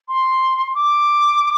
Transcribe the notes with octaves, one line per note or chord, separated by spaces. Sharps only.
C6
D6